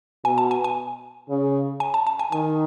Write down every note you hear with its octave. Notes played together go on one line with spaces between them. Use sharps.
B2 G#5
A5
G#5
G#5
C#3
G#5
A5
A5
G#5
D#3 G#5